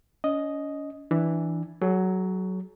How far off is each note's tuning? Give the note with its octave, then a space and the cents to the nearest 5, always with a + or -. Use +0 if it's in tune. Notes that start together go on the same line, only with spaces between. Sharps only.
C#4 +35 D#5 +0
E3 +0 D4 +5
F#3 +10 G#4 +45